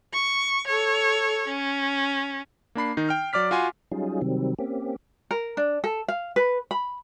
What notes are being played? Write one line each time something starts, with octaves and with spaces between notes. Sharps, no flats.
C#6
A4 C#5
C#4
A#3 D4 B5 C7
D#3 D#4
G5 F6
F#3 D5 D6 F6 B6
F4 F#4 G#5 C6
F#3 G3 C#4 D#4 F4 G#4
C3 D#3 F#3 G3 C4
A#3 C4 C#4 G4
A#4
D4
A4
F5
B4
B5